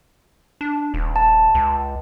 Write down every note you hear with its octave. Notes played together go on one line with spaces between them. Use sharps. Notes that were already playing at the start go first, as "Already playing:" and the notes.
D4
D#1
A5
C#2